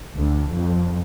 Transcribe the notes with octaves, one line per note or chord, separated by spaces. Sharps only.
D2
F2